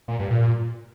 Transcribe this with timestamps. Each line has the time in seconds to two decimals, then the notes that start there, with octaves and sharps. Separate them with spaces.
0.08 A#2
0.19 G2
0.31 A#2